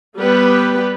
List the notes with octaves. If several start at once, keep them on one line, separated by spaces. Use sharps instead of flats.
G3 B3 G4 B4